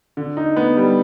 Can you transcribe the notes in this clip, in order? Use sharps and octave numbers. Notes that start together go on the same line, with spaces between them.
D3
D#4
B3
G3